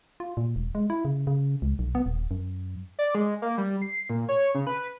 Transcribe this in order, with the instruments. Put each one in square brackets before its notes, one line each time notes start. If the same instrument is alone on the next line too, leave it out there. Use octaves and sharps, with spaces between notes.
[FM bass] F4
A#2
E1
G#3
E4
C#3
C#3
C#2
B1
B3
D#1
F#2
[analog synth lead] D5
G#3
A#3
G3
C7
A#2
C#5
C#3
B4